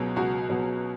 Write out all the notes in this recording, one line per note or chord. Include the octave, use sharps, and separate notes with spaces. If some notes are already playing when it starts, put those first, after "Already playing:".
Already playing: C#2 B2 F#3
C#2 F#4
B2 F#3